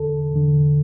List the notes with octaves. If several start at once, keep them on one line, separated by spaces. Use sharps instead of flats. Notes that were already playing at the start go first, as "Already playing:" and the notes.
Already playing: E2 D3 A4
E2 D3